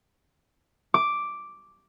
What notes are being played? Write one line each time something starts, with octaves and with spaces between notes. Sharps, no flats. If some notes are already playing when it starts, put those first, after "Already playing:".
D6